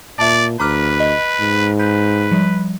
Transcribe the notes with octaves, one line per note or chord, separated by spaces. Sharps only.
A#2 D5 E5 A5
D2 B4 A#5 D6 F6
D#5
G#2
B4 G6
F3 G3